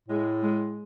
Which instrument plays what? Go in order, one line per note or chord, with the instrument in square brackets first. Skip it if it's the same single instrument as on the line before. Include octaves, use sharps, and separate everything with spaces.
[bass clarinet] A2 [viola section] G#3
[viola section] G#3